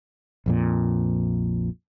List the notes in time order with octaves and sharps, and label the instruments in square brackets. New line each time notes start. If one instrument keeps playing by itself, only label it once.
[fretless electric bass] A#1 F2 A#2